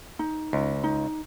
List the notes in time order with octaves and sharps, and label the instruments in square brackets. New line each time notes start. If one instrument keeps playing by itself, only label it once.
[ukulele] D#4
[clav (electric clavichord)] C#2
[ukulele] D#4